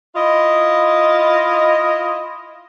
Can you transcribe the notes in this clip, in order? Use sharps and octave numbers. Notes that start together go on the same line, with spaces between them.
E4 F4 D#5